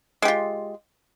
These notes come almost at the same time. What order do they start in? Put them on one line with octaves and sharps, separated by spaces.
G#3 G4 F4